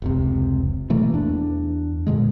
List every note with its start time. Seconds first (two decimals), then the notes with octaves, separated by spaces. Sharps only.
0.02 F1 C#2 C3
0.90 B2 E3 A3 A#3
1.14 E2 D4
2.07 A#2 D3 G#3